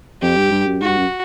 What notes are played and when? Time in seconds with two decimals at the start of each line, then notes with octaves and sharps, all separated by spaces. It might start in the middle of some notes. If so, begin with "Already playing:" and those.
0.22 F2 G4
0.37 G2
0.51 G2
0.66 F#2
0.81 G#2 F#4
0.89 G2
0.97 F#2